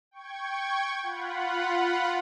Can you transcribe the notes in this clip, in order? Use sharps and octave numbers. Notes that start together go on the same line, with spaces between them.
G5 C#6 G#6
F4 F#5 B5